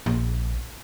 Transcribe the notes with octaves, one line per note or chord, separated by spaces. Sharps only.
A#1